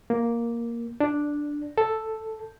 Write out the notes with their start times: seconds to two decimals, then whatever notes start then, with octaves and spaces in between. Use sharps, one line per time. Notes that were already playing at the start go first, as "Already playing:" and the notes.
0.10 A#3
1.00 D4
1.78 A4